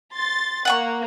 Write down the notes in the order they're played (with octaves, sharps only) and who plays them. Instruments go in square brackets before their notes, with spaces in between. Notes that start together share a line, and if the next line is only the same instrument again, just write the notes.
[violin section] C6 A6
[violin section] A#3 [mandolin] F#5 G5 C#6